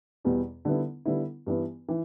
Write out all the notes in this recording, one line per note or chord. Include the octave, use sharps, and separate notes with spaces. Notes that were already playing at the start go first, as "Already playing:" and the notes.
E2 B2 G3 B3
D3 G3 B3 E4
D3 G3 B3 E4
G2 E3 B3
E3